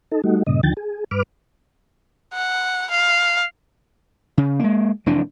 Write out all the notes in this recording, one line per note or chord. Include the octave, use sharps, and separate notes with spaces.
D#4 A4
G3 A3 D#4 F#4
G2 A#2 C#3 D#5
D2 D3 D#3 F3 G5 A6
G#4
G2 B4 D6 F6
F#5
F5
C#3
G#3 A#3
F1 F#2 E3 D4